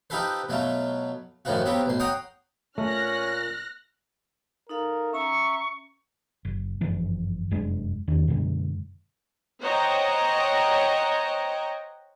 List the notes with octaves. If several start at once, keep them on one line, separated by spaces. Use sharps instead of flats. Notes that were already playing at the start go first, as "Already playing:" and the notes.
D#4 F4 G4 A4 B4 C5
B2 F#3 A3 F4
F#2 A2 D#3 F3 F4 F#4
F#3 B3 C4 F4 G4
B1 A2 C6
C#5 F#5 G5 A#5 C6 D#6
A#2 A3 C#4 F6 F#6 A#6
D#4 A4 A#4 F5
C#4 E5 A#5 C#6
F#1
G1 F#2 E3 F3
F1 F#2 G#3 D4
E2 D#3 D4
F#2 B2 D3 G#3
C5 C#5 D#5 F#5 G5 A#5